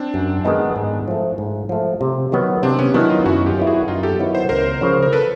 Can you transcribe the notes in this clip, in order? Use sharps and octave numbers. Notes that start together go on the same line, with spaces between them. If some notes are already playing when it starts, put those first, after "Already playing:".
Already playing: C4 D4
F#2
D#3 G#3 B3 D#4
G#2
F3 A3
G#2
F3 A3
C3
D#3 F#3 B3
C3 C4 D4
B3 C#4
D#3 F#3 B3 D4 E4
D#4 F4
F#2 E4 F#4
F4 G4
D#3 F#3 B3 E4
F#4 G#4
F#2 D#4 F4
G4 A4
D#3 F#3 B3 E4
C5
C#2 A#4 C5
C#3 F3
A#4
A4 B4